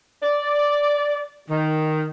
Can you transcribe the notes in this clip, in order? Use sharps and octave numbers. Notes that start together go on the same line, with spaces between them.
D5
D#3